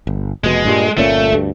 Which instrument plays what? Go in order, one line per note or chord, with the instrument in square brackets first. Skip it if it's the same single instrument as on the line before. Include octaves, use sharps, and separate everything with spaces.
[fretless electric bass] G1
[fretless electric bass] F1 B2 [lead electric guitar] G#3
[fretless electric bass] G2 A#2 G3
[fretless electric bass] G1 A#2 C#4 [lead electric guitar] A3
[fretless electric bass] D2 G2